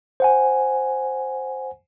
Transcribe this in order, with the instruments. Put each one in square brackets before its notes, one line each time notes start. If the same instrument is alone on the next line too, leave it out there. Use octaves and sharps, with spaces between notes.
[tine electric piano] C5 F#5 G#5